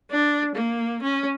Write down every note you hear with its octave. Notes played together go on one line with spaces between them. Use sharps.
D4
A#3
C#4